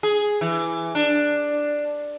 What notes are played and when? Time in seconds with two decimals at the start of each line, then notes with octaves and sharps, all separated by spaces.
0.03 G#4
0.41 E3
0.95 D4